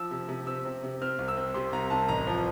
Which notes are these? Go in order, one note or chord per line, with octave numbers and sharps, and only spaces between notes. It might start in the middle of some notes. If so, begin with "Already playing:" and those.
Already playing: F3 E6
C3
C3
C4 E6
C3
C3
C4 F6
C2
E6
C4
C3 C6
C2 A#5
C2 A5
A1 A#5
F3